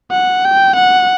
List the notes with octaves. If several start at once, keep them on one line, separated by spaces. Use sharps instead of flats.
F#5
G5
F#5